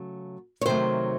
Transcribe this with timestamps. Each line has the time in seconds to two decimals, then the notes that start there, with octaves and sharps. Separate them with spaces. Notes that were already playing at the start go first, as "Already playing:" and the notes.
Already playing: C#3 F#3 A3
0.61 C#5
0.66 C3 D#3 F#3 A3 C5